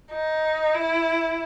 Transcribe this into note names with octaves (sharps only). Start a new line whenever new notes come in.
D#4
E4